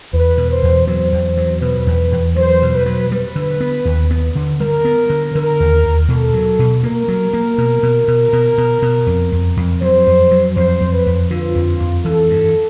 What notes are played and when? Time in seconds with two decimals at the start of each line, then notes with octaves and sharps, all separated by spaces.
0.13 E2 B4
0.38 B2
0.51 C5
0.63 E2
0.87 F#3 C5
1.13 E2
1.37 F#3
1.62 B2 B4
1.87 E2
2.12 E2
2.36 F#3 C5
2.62 B2
2.74 B4
2.86 F#3
3.11 G3 B4
3.36 D3
3.61 B3
3.85 D#2
4.11 B3
4.35 D3
4.60 G3 A#4
4.85 B3
5.10 D3
5.34 D3 A#4
5.60 D#2
5.85 D#2
6.09 B2 A4
6.34 F#3
6.59 B2
6.83 A#3 A#4
7.08 F#3
7.33 A#3
7.58 B2
7.83 B2
8.08 B2
8.33 B2
8.58 B2
8.82 B2
9.07 F2
9.32 F2
9.57 F2
9.81 F#3 C5
10.07 F2
10.31 F#3
10.56 F2 C5
10.81 F2
10.93 B4
11.06 F2
11.30 D3 F4
11.55 F2
11.80 F2
12.05 E3 A4
12.30 G2